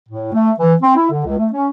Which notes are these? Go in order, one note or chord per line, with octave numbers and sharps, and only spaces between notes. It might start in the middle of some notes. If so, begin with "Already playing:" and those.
A2
A3
E3
C4
E4
D3
C#2
A3
C#4